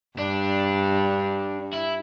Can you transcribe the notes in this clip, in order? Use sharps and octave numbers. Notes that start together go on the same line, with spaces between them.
G2 D4
E4